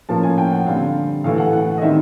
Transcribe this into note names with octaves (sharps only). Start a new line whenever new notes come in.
A2 F3 A#3 C#4 A5
G#5
G5
F#5
D3 G3 C4 F5
A2 E3 A3 F5
F#5
F#5
D#5
D#3 G3 C4 E5